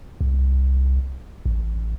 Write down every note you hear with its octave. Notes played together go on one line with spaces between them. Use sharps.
C2
A1